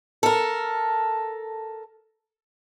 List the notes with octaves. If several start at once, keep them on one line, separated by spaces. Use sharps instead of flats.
A4 A#4